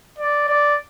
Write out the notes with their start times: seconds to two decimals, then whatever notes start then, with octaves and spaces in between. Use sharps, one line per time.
0.19 D5
0.48 D5